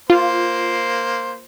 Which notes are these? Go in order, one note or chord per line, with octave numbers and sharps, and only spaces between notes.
A#3 F4 C5